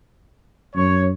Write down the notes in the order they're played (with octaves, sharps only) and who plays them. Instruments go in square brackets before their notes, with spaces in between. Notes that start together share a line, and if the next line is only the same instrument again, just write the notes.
[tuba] F#2 [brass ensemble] C#5